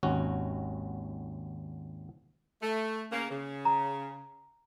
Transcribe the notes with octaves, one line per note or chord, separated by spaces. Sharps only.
G#1 D#2 C#4 F#4
A3
C#3 A#3
C#3
A#5